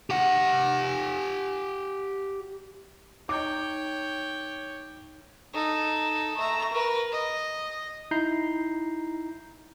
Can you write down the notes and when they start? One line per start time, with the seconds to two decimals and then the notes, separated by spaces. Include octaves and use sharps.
0.10 G4 F#5
3.29 D#4 C#5 G5 D6
5.53 D#4 A4
6.36 A3 A#5
6.73 A#4 B4
7.12 D#5
8.11 D#4 E4 A#5 G6 C7